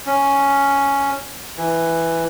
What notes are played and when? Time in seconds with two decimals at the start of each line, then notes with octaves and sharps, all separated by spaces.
0.06 C#4
1.57 E3